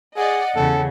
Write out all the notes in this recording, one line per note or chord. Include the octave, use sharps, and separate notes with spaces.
G#4 D5 D#5 F#5
E2 C#3 A4